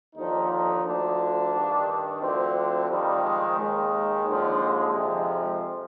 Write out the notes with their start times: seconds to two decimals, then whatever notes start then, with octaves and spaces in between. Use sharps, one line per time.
0.16 D#2 D3 F3 D#4
0.50 D#4
0.84 D2 D3 F3 D4
1.52 G2 D#3
2.21 D2 D3 F3 C4
2.54 C4
2.88 F2 D#3 G3
3.22 G#3
3.56 D#2 D#3 G#3
4.24 D#2 D3 F3
4.93 F2 C3 F3